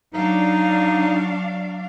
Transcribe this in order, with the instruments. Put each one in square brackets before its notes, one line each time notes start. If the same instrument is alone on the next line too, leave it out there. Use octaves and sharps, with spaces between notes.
[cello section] F#3 D4 F5 [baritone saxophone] D#4